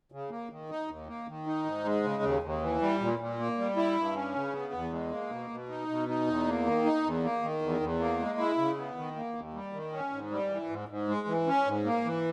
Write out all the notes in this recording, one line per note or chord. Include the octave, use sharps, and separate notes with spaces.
C#3
A#3
D#3
D#4
D#2
A#3
D#3
D#4
G#2
G#3
C#3
D#2
D#2
E3
G3
A#2
A#2
A#3
G3
E4
G2
C#4
C#3
B3
E2
G#3
A#3
B2
B2
D#4
B2
D#4
E2
A#3
D#3
D#4
E2
A#3
D#3
E2
E2
A#3
G#3
E4
C#3
B3
D#3
A#3
D#2
G3
D#3
C#4
G#2
G3
E3
G#2
G#2
G#3
E3
C#4
G#2
A#3
E3